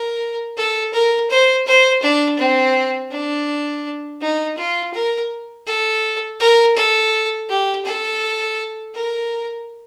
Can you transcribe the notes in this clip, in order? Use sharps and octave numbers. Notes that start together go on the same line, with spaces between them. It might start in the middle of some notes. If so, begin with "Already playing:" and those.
Already playing: A#4
A4
A#4
C5
C5
D4
C4
D4
D#4
F4
A#4
A4
A#4
A4
G4
A4
A#4